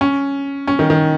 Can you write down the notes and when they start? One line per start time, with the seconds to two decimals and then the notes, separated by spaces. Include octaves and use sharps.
0.01 C#4
0.67 C#4
0.79 D#3
0.90 D#3